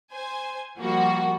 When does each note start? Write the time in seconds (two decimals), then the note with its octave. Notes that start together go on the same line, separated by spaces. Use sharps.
0.13 C5 G#5
0.79 F3 G3 A#3 F#4